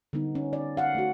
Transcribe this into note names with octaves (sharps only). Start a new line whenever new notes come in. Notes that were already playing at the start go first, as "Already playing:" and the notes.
D3 G3 B3 D#4
C#4
D5
F5 F#5
A3 F#4